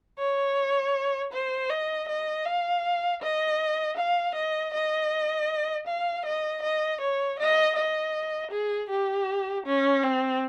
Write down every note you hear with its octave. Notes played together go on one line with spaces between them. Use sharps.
C#5
C5
D#5
D#5
F5
D#5
F5
D#5
D#5
F5
D#5
D#5
C#5
D#5
D#5
G#4
G4
C#4
C4